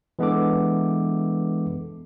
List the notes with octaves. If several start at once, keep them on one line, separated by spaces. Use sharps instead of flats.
E3 G#3 B3 D4 A4 D6